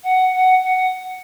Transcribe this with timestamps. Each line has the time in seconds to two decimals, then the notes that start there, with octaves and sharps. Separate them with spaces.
0.03 F#5
0.33 F#5
0.64 F#5